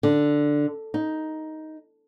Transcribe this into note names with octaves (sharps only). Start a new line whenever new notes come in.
D3
D#4